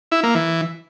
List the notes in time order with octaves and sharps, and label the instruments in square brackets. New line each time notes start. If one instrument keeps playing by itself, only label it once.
[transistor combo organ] E4
A#3
E3